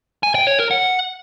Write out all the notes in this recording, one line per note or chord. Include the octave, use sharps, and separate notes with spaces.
G#5
G5
C#5
A#4
F#5